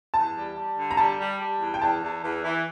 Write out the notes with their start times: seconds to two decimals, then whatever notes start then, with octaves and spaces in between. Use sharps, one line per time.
0.14 E2 A5
0.35 G3
0.56 G3
0.77 D3
0.91 A#5
0.97 G3 A5
1.19 G3
1.39 G3
1.60 E2
1.74 G5
1.81 E2 A5
2.03 E2
2.23 E2
2.43 E3